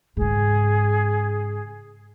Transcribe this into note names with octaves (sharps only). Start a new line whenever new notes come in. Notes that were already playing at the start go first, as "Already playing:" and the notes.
G#2 C#3 G#4